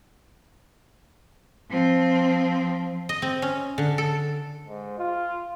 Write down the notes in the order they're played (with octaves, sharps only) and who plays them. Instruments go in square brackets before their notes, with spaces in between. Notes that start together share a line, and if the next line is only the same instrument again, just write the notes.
[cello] F3 C4
[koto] D#5
C4
C#4
D3
A4
[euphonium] G#2
F4